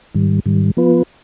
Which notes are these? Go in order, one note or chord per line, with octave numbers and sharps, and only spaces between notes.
G#2 D#3 G3
G#2 D#3 G3
F3 B3 F4 B4